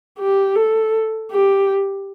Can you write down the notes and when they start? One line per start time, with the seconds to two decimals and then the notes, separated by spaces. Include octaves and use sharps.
0.19 G4
0.56 A4
1.31 G4